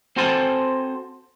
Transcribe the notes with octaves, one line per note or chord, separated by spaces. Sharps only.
C4 F#4 A4 C5 G#5 A5